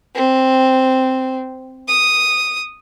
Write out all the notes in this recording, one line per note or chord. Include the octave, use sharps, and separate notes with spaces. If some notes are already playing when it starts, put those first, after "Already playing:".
C4
D#6